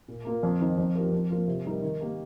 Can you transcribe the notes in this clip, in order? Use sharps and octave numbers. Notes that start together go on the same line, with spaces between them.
A#2
A#3 F4 A#4
F2
D#3 C4 D#4
F2
F3 D#4 G4 A#4
F2
F3 A#3 F4 A#4
C3
G3 D#4 A#4
D#3
A#3 G4 A#4